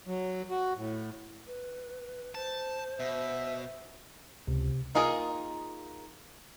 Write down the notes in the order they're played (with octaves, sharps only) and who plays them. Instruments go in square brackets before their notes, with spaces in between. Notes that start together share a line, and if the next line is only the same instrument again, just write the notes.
[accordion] F#3
F#4
A2
[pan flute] B4
[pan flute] C5 [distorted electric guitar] A5
[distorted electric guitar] B2 [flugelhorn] E5
[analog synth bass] C#2 [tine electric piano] C3
[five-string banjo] A#3 D#4 F4 G#4 A#4